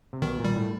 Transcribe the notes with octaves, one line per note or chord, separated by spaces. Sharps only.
C3
B1 B2 D#3
A#2
G3
A2